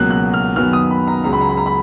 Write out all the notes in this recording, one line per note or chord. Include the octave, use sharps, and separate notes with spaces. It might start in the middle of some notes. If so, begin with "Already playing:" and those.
Already playing: C#2 B2 F#3 A#3 F#6
F#6
F6
F#2 D#3 F#3 B3 F6
D#6
B5
A#5
C#2 C#3 F#3 A#5
B5
A#5
B5
A#5
B5